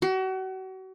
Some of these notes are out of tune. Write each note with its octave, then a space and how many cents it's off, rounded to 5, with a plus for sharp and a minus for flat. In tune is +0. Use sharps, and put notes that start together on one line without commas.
F#4 +35